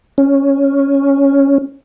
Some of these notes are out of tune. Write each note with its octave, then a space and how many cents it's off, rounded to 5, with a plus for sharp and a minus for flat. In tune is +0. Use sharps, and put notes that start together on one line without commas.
C#4 +0